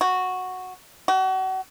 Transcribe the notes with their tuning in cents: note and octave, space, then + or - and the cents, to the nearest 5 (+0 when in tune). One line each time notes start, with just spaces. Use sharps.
F#4 -5
F#4 +35